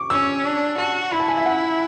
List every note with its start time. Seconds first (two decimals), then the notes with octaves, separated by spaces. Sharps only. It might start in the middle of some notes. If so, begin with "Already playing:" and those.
Already playing: C#6 D6
0.10 C#4 E6
0.45 D4
0.78 F#4 A5
1.12 E4 B5
1.20 A5
1.28 G#5
1.37 E5
1.46 F#5